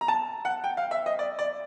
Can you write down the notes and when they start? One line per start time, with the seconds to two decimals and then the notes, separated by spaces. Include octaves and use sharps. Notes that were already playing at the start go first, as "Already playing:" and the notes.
0.01 A#5
0.08 A5
0.45 F#5
0.64 G5
0.77 F5
0.91 E5
1.06 D#5
1.19 D5
1.39 D5